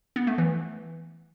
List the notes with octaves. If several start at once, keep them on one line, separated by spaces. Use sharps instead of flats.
B3
A3
E3